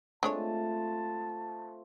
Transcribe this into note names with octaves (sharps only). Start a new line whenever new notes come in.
G#3 A3 C4 D4 F4 C#5 A5